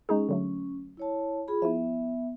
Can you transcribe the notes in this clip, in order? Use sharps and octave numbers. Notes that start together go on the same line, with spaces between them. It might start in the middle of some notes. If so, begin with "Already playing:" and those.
G#3 C#4 D#4 G#4
D3 F#3 A3
E4 C#5 A5
F4 G#4 B5
F3 B3 E4 E5